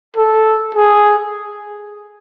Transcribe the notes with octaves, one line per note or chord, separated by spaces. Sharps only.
A4
G#4